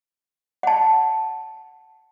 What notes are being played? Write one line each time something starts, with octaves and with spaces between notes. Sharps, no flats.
F#5 A5